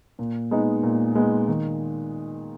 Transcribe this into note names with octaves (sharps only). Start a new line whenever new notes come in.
A#2
G#3 B3 D#4
A#2
G#3 B3 D#4
D#3